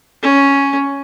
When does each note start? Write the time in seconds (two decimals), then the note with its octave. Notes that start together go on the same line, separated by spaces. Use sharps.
0.23 C#4